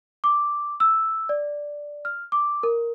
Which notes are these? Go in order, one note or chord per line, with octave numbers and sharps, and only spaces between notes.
D6
E6
D5
F6
D6
A#4